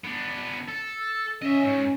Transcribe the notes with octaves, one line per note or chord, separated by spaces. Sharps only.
B3 D4
A4
E6
C#4 D#5 E5
G#2